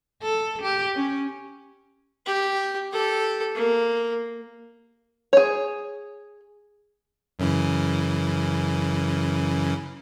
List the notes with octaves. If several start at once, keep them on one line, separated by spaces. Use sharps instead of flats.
A4
G4
C#4
G4
G4 A4
A#3
G#4 C#5
F#2 C#3 E3